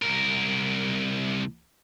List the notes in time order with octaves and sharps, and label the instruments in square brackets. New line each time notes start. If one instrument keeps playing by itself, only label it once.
[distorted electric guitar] C2 A#4